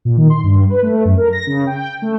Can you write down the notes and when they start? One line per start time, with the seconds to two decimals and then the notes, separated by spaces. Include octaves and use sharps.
0.05 A#2
0.17 D#3
0.30 C6
0.44 G2
0.70 B4
0.83 A3
1.05 F#2
1.18 A#4
1.33 A#6
1.47 C#3
1.66 G5
2.02 A3